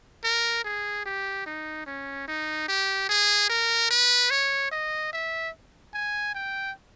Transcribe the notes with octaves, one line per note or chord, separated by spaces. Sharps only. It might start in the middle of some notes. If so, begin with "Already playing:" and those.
A#4
G#4
G4
D#4
C#4
D#4
G4
G#4
A#4
B4
C#5
D#5
E5
G#5
G5